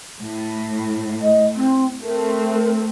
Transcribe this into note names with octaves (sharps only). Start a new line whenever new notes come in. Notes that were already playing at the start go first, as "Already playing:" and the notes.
A2
D#5
C4
A3 C4 A#4